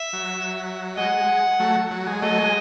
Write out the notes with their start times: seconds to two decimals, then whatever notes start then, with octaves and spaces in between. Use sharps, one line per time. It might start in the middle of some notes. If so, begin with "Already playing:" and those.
Already playing: E5
0.13 F#3
0.97 G#3 D#5 F#5
1.18 G#3
1.60 F#3 A3
1.91 F#3
2.06 G#3
2.22 F#3 A3 D#5
2.38 G#3